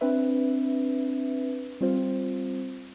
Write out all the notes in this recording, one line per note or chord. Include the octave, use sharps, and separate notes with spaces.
C4 D4 B4 E5
G3 C4 F4 C5